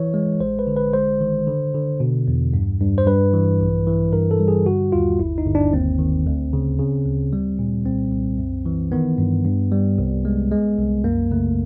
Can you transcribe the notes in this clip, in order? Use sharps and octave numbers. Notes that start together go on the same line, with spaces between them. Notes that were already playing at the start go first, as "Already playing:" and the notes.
Already playing: E3 C#5
G#3
A1 C5
B4
D3
B4
G#3 C5
D#3
D3
D3
B2
E2
G2
G2
C5
G2 B4
E3
A#1
E3
G2 A#4
A4
G3
G#4
D3 F#4
D#2 F4
G1 E4
D#4
G1
D4
D#2 C4
D#3
D2
C#3
C#3
D2
G3
A#2
C2 C4
C2
F#2
E3
D#3 B3
G2
G2
G3
C2
G#3
G#3
C2
F#2 A#3
C#3 A3